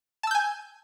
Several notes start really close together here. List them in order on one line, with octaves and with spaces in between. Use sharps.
A5 E6 G6 G#5